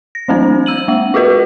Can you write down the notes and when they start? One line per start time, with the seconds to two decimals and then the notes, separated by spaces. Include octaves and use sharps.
0.15 A#6
0.28 E3 F#3 A3 C4 D4 C5
0.66 E6 D#7 F#7
0.88 G#3 A#3
1.14 F4 F#4 G#4 B4 D#5